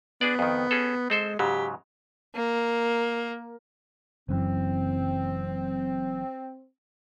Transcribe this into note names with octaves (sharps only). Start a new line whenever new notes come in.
B3 D4 G#4 D5
F2 D#3
C#4 G#4 A4
G#3 C4 A4 C5
G#2 C#3 F#3 G4
A#3
F#1 F#2 E3 C4